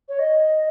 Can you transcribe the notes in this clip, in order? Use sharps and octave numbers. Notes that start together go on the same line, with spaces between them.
C#5
D#5